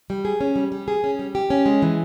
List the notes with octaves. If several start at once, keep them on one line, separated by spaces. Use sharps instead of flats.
G3
G#4
C#4
G3
G3
G#4
C#4
G3
G4
C#4
G#3
E3